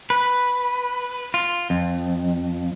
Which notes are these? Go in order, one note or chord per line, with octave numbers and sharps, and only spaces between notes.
B4
F4
F2